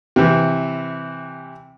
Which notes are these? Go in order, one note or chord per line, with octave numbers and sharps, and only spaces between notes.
C3 E3